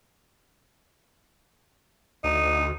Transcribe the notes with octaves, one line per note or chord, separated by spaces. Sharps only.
D2 D#4